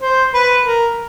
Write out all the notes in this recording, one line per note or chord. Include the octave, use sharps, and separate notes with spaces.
C5
B4
A#4